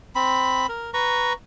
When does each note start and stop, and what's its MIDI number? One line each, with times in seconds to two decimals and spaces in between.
0.15 0.66 60
0.15 0.66 83
0.69 0.91 70
0.94 1.33 71
0.94 1.33 82
0.94 1.33 85